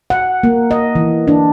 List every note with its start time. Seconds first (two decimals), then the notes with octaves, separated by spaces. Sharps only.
0.10 F#5
0.43 A#3
0.71 D#5
0.95 E3
1.27 D4